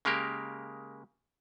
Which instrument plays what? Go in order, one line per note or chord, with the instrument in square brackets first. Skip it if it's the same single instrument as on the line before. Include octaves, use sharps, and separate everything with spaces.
[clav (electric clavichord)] C#3 G#3 A#3 G4 A#4